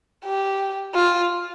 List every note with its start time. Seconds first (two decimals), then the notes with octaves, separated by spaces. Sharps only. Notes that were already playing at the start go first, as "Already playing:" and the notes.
0.25 G4
0.94 F4